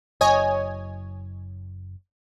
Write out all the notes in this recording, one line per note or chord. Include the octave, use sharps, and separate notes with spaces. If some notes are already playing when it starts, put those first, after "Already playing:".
F#1 C#5 D#5 G#5